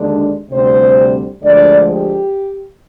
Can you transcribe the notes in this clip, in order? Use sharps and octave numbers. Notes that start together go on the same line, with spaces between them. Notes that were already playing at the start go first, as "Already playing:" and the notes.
Already playing: D#2 D3 G#3 D4
D2 C3 G3 C4 C5
D2 D3 F3 G#3 D5
G4